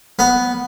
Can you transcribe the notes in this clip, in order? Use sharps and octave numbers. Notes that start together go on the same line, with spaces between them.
B3